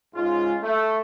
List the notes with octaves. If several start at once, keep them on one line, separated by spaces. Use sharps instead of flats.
G#2 G#3 C#4 F4
A3